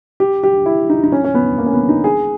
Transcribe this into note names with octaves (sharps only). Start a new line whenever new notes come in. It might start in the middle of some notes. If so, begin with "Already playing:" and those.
G4
G4
E4
D#4
D#4
C#4
C#4
B3
A#3
C#4
B3
D#4
G#4